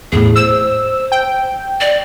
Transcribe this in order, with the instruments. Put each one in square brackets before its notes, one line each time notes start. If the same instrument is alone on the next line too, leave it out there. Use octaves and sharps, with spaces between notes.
[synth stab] E2 A2 [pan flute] G#4
[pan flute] C5 [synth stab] E6
[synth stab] G5
[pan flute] D5